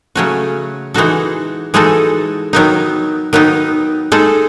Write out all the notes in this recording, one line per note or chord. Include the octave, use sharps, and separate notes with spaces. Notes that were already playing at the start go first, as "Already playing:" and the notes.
C#3 F#3 A3 C#4 F#4
E3 G#3 D#4 F#4 A4
E3 G#3 D#4 F#4 A4
D#3 F#3 B3 D#4
D#3 F#3 B3 D#4
G#3 D#4 A4